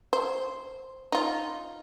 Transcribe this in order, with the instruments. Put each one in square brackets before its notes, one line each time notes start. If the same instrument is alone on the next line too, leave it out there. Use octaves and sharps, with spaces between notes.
[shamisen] C5
D#4 F4